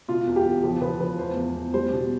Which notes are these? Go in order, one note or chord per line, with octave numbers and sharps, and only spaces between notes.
B2 F4
E2
G4
E2
F3 G4
F3 B4
F3 B4
E2 C5
E2
E2
G3 C5
B2